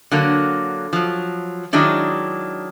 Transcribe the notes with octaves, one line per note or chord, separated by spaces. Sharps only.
D3 F#3 A#3
F3 F#3
D#3 F#3 G#3 D4 E4